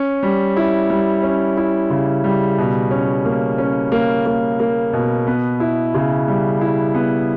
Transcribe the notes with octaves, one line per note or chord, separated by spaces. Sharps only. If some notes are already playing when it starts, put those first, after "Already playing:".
Already playing: C#4
G3
E4
G3
C#4
E4
C#3
G3
B2
C#4
A#3
C#4
A#3
A#3
A#3
B2
B3
E4
C#3
G3
E4
B3